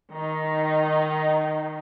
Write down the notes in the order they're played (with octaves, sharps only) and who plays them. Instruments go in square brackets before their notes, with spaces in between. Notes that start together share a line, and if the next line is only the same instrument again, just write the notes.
[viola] D#3 D#4